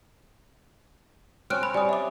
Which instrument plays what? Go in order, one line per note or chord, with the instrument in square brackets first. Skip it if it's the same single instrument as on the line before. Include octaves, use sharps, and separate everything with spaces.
[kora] C4 C#4 [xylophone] F6 F#6 D7
[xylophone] B5
[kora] G3 [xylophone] G#5 D#6
[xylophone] E5 D6